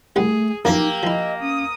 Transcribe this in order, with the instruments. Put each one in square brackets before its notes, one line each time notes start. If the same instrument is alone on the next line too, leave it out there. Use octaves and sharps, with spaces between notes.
[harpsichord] C2 G3 F#5 [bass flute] A3 [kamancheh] G#4
[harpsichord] F#2 E3 F3 [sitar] A#3 [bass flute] D#4 [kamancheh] G4 E6
[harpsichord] F3 E4 [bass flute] D#5
[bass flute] C#4 [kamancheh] D#6